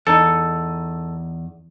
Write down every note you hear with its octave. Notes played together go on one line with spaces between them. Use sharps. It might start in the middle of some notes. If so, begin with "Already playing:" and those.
E2 D#4 A4